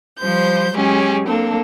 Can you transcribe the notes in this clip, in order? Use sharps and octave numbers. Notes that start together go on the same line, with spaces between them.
F3 G3 C5 G6
F#3 G#3 C#4 G4 G#4
A#3 C4 D4 A4